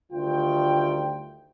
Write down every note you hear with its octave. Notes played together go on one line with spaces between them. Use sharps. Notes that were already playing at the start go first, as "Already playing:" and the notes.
D2 D#3 G3 F4 G5